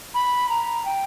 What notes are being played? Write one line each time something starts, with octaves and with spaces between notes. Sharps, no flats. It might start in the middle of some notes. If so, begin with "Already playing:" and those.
B5
A#5
G5